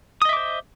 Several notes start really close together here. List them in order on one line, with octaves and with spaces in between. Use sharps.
D#6 D#5 E5 D6 C5